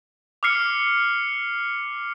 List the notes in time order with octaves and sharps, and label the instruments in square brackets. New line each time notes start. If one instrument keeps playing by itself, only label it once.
[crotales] D6 E6 F6 C7 C#7